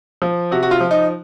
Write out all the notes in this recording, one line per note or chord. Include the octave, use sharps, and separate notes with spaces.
F3
C3 F#4
F#4
F4
F3
D#4